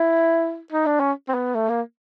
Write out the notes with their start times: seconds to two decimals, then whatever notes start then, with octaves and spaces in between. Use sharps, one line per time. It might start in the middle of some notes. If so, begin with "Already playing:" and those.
Already playing: E4
0.72 D#4
0.86 D4
1.00 C#4
1.28 C4
1.34 B3
1.55 A3
1.69 A#3